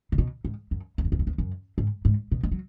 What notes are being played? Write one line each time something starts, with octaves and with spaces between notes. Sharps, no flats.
C#3
B2
G#2
F#2
E2
F#2
E2
F#2
E2
F#2
G#2
G#2
B2
G#3
F#3